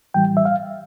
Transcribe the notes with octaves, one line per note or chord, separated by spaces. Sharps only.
A2 E3 G3 G5
E5
F5